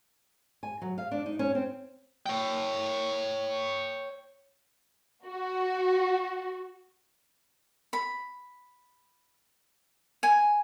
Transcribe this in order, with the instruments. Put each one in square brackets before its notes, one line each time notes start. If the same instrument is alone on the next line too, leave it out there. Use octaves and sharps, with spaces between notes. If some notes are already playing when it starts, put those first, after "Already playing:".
[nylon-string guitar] G#5
F#3
F5
D4
D#4
C#4
C4
[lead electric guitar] C#5 G5
[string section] F#4
[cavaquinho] B5
G#5